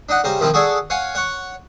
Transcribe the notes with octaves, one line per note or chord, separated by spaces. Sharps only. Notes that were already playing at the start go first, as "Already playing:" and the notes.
D4 D#4 F#5
C#3 G3 C5 A#5
D#3 F3 C4 E4 F4
F#4 G#4 A4 D5 G#5
C#5 F5 F#5 G#5
C#5 F#5 C#6